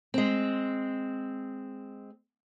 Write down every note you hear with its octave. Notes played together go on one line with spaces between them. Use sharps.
G#3 C4